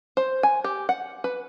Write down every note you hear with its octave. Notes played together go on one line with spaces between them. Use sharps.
C5
G#5
G4
F#5
B4